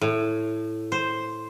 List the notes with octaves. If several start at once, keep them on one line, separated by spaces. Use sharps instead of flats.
A2
C5